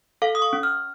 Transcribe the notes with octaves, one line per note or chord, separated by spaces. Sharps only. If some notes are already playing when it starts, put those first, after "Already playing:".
A4 F5
D#6
C#6
C#4
F6